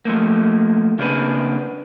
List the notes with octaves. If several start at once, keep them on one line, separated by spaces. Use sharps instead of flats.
F3 A3 A#3
C#3 A#3 C4 D4 G#4 B4